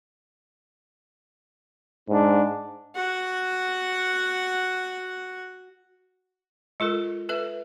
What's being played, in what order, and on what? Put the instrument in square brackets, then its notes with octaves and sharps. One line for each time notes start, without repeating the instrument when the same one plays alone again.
[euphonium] G#2 [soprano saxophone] D4
[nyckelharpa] F#4 F#5
[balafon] G#3 F4 A4 A#4
A4 B4 E5